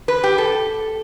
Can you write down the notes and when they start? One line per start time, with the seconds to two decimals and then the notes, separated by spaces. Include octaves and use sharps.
0.08 B4
0.24 G4
0.38 A4